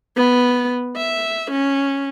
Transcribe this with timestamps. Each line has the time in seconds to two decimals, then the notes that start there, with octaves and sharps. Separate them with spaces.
0.16 B3
0.96 E5
1.51 C#4